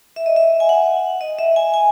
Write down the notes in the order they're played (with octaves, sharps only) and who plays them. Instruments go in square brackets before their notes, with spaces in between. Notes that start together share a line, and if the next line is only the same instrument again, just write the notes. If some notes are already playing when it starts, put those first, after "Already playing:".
[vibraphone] E5
D#5
E5
G#5
F#5
D#5
E5
G#5
G#5